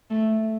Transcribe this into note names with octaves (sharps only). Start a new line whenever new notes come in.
A3